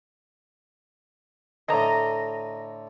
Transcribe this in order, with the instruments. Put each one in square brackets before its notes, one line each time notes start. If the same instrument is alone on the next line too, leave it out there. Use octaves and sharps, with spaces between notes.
[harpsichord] A2 D3 [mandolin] D#5 A#5